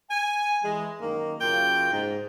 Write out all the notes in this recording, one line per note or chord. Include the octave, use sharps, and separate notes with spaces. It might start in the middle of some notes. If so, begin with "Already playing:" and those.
G#5
E3 G#3
F#2 D#3 A#3
F#2 C#3 A#3 F4 G5
G#2